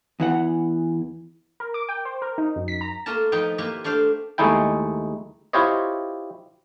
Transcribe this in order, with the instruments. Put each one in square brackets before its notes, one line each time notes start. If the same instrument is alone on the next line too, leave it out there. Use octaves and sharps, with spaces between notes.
[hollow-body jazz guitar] E2 E3 F#5
[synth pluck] A#4
D6
G5
C5
A#4
D#4
F#2
B6
A#5
[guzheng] A3 A#3 F4 A#4 A5
F3 D#4 B4 G5
A#3 E4 F4 G4 B4
A3 D4 C5 F5 G5
[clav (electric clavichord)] D#2 G#3 A3 D#4 E4 G5
E4 F4 G4 C5 C#5 D#5